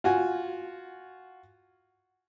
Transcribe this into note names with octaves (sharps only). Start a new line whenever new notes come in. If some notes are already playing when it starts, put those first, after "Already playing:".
F4 F#4 G#5